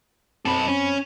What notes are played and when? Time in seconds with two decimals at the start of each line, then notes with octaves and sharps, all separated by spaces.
0.45 B1 F#2 C4 A4 B5
0.68 C#4